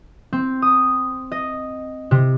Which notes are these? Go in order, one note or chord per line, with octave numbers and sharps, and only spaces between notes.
C4
D#6
D#5
C3